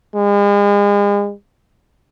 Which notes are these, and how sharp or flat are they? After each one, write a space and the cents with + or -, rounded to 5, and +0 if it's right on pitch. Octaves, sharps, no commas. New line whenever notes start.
G#3 -40